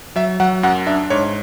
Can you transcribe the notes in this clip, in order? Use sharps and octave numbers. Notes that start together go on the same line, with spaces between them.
F#3 E5
F#3 F#5
F#2 F#5
D4 E5
G#2 C#5